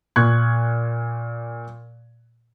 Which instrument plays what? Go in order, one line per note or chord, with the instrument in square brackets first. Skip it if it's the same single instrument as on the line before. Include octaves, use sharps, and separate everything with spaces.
[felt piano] A#2 C#6 F#6 G#6